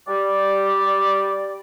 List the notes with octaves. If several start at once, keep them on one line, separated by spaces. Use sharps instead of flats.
G3 G4 D5